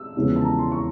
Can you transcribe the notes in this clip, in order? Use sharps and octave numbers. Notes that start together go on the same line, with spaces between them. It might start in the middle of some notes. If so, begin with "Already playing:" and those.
Already playing: E6
E2 C#3 F3 G#3
A5
A#5
C6
C#6